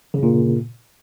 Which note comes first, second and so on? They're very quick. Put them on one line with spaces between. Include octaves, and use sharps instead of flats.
C#3 G2 A#2